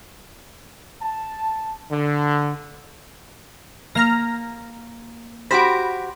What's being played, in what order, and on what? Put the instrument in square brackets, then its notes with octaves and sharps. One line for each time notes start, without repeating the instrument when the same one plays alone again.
[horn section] A5
D3
[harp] A#3 [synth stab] A#5 F6 A#6
[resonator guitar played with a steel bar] F#4 G4 C5 [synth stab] B5 D7 [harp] A#6 B6